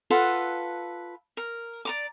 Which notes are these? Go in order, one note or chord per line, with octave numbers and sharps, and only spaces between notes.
F4 A4 B4 F#5
A#4
D5 A#5 D6